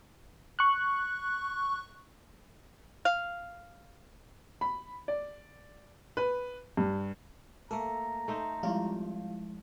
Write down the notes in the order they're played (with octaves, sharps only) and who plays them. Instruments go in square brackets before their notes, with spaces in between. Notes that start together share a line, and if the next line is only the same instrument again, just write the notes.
[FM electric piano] C#6 F#6
[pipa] F5
[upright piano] B5
D5
B4
G2
[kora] A3 A#3 [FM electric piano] A4 [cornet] A#5
[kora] A3 D#4 C5
[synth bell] F3 G#3 E4 [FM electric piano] G3 F4